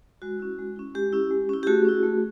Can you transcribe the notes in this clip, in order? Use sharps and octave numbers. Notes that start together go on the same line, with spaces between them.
G#3 F#4
C#4 E4
G#3
C#4 E4
G#3 G4
C#4 E4
G#3
C#4 E4
G4
A3 F#4 G#4
C#4 E4
A3